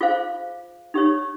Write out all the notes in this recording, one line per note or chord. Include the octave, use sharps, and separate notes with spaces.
F4 G#4 C5 F5
D#4 G4 C#5